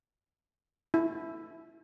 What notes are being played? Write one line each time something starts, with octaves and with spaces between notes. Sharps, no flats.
E4